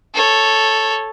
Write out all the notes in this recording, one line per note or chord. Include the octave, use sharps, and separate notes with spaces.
A4 C#5